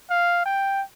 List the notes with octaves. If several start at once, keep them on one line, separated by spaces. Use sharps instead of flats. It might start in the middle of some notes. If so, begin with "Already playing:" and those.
F5
G5